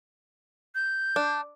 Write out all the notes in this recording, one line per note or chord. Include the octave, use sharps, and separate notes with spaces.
G6
D4